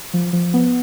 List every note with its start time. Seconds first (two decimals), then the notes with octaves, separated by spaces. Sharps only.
0.14 F3
0.33 F3
0.54 B3